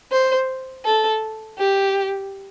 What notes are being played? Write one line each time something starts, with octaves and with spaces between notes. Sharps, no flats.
C5
A4
G4